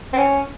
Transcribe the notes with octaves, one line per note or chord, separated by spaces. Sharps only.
C4
C#4